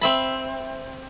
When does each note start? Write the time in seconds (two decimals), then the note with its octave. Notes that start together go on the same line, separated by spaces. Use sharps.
0.01 C4 E5 B5